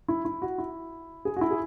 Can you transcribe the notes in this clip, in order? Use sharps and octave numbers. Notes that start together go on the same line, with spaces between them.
E4
E4
F#4
E4
G#4
F#4
E4
G#4